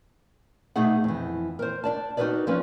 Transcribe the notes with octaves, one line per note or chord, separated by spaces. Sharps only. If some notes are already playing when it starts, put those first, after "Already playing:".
B2 A3 D#4 G#4 F#5
F2 E3
A#4 C5
D4 D5 A5
D#4 F#4 G#4 A#4 B4 D5
F3 G3 C#4 B4 D5